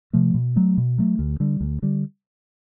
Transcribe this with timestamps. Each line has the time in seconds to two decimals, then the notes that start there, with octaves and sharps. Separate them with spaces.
0.13 C3 F3 A3
0.34 B2
0.56 F#3 A3
0.78 B2
0.98 F#3 A3
1.19 D2
1.40 D3 G3
1.61 D2
1.82 D3 G3